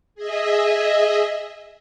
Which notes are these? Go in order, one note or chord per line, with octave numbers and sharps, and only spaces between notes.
G#4 D#5 E5